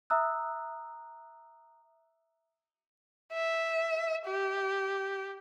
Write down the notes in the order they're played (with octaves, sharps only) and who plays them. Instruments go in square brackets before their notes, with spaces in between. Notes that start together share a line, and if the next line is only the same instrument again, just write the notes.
[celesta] E5 A#5 D#6 E6 F#6
[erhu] E5
G4